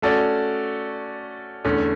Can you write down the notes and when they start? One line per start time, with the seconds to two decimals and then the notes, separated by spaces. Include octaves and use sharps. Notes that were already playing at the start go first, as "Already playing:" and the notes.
0.02 A3 C#4 F#4 A4 D5
1.65 E2 D3 A3 C#4